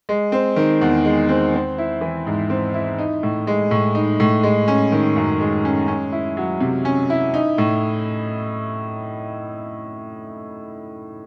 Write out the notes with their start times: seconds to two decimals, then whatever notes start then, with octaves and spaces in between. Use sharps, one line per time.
0.09 G#3
0.32 C4
0.56 D#3
0.81 E2
1.05 G#3
1.29 C4
1.54 C4
1.78 E4
2.01 E3
2.27 G#2
2.50 C4
2.74 E4
2.99 D#4
3.23 A2
3.47 G#3
3.71 A2
3.95 D#4
4.20 A2
4.43 G#3
4.68 C#4
4.92 D#3
5.16 F#2
5.41 G#3
5.65 C#4
5.88 C#4
6.12 E4
6.37 F#3
6.60 C3
6.85 C#4
7.10 E4
7.34 D#4
7.58 A2